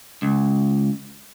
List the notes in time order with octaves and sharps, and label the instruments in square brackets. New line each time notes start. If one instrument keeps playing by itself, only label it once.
[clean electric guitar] C#2